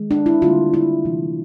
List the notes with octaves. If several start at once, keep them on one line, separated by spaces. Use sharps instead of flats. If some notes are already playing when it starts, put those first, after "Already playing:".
Already playing: D#3 G#3
D4
E4
D3 G3 A#3 F4
E4
C3 E3 A3